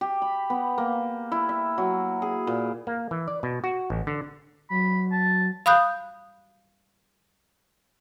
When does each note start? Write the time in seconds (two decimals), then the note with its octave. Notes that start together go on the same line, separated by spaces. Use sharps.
0.01 G4
0.22 B5
0.50 B3
0.78 A#3
1.32 E4
1.49 E5
1.78 F#3
2.22 G#4
2.47 A#2
2.87 A#3
3.11 E3
3.28 D5
3.43 B2
3.64 F#4
3.90 A1
4.07 D3
4.70 F#3 B5
5.12 A5
5.66 F5 B5 D#6 F#6 G6